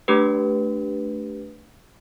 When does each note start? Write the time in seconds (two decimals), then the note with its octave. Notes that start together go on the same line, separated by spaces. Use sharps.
0.08 A3 D4 G4 B4